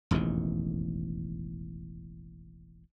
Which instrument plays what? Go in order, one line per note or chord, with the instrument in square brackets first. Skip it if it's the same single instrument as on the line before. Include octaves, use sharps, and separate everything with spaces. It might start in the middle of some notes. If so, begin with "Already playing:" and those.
[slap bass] E1 A1 F2 D#3